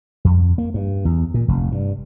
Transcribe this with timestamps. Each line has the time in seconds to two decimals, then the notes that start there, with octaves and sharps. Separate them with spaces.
0.25 F2
0.58 A#3
0.74 G2
1.05 E2
1.34 A#2
1.48 F1
1.72 G2